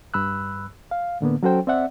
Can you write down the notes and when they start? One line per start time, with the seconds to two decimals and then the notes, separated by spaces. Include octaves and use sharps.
0.14 G2 B5 E6 F#6
0.91 F5
1.21 A2 D3 A#3 B3
1.43 F#3 C#4 F#4 A4 C5 G5
1.67 C4 D5 E5 F#5